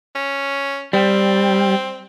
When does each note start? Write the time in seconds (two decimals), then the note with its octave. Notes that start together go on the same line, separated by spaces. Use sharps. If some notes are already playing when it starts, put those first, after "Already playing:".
0.15 C#4
0.93 G3 C4